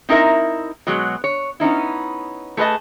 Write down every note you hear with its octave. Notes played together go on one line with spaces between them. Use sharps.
C4 D#4 E4 A#4 E5
B2 F#3 G#3
C#5
B3 C#4 D#4 E4
A3 G#4 B4 C5 D#5 A5